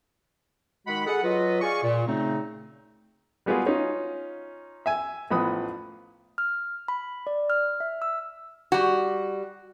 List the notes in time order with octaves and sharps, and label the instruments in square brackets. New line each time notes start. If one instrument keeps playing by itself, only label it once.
[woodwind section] D#3 G#3 F#4 F#5 B5
G#4 A4 F#5
F#3 F4 B4 D#5
G#4 D5 F5 G#5 C#6
A#2
C#3 A3 C4 D#4
[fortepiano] G3 G#3 B3 F4 F#4 G#4
C#4 D#4 F4
E5 G#5
A1 F3 B3 B5 D#6
[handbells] F6
B5
D5
F6
E5
E6
[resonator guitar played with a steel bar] G3 F#4